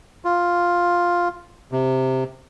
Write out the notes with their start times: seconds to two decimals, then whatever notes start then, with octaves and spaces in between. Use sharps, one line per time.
0.25 F4
1.72 C3